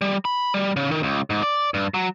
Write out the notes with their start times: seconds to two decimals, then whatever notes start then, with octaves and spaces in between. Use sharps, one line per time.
0.01 G3
0.25 B5
0.54 G3
0.76 C#3
0.91 D#3
1.03 C#2
1.30 G#2
1.43 D5
1.74 G2
1.94 F#3